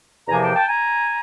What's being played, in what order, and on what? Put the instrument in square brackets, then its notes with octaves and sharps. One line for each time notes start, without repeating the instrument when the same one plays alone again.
[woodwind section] E2 C3 F3 A#3 G#5 A#5
G5 A5
G5 A5
G#5 A#5